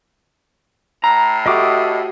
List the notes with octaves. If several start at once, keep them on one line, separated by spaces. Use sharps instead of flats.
A2 A#5
A3 F#4 G4 D#5 D6 D#6